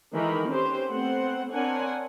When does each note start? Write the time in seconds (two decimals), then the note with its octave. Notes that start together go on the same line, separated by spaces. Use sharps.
0.14 D#3 E3 G#3 A4 A#4 B5
0.47 C4 C#4 G4 B4 C5
0.89 A3 B3 C4 C5 F#5
1.52 C4 D4 A#4 C#5 F#5 G#5